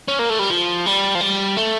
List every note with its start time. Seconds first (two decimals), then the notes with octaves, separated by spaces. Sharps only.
0.08 C#4
0.19 A#3
0.30 A3
0.39 G3
0.50 F3
0.86 G3
1.15 F3
1.21 G3
1.57 A3